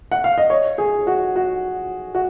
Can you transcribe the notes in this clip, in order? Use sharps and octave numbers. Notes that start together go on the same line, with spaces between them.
F#5
F5
D#5
C#5
G#4
F#4
F#4
F#4